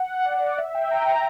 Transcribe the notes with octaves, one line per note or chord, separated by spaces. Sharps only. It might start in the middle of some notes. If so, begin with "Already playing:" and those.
Already playing: F#5
D5
F#5
E5
G5
A#5